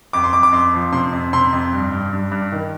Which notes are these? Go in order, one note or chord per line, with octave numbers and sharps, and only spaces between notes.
F2 D6
C6
F2 D6
D6
F2 C6
F3
C3 C6
F2
C3 C6
F2
G2
G2
G2
G2
D#3